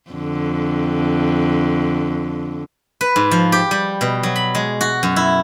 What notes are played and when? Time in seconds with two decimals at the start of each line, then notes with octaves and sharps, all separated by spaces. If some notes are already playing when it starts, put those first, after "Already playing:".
0.10 F2 D3
3.01 B4
3.16 G#2
3.31 F3
3.52 G4
3.71 G3
4.01 B2
4.23 F#3
4.36 B5
4.55 G#3
4.81 F#4
5.03 F#2
5.16 E4